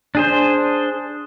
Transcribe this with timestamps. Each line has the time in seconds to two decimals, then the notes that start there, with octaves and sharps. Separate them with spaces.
0.15 D4 G#4 C5